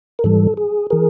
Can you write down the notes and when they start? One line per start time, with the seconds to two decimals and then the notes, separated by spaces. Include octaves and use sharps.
0.19 A#4
0.24 G#2 E3 G3 A4
0.57 G#4
0.90 E3 G#4 A#4